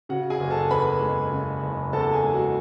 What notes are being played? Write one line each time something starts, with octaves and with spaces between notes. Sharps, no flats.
C#3 F#4 F#5
G#4 G#5
F#1
A4 A5
E2 B4 B5
G#3
C#3
F#1
E2 A4 A5
G#4 G#5
G#3
F#4 F#5